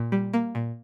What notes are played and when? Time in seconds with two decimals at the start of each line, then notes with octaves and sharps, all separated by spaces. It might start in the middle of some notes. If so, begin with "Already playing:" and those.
Already playing: A#2
0.12 G3
0.33 A#3
0.55 A#2